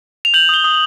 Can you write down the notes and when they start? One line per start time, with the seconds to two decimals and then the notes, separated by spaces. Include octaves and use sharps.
0.25 F7
0.34 G6 F#7
0.49 D#6 G7
0.64 D#6